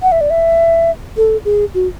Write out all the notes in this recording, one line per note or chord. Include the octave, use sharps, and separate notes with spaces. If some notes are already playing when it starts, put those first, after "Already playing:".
F#5
E5
D5
E5
A4
G#4
F#4